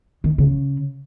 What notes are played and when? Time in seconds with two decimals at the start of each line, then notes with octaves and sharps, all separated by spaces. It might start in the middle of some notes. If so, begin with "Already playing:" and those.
0.24 D#3
0.38 C#3